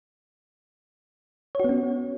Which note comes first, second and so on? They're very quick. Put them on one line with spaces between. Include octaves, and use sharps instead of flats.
C#5 F#4 B3 C#4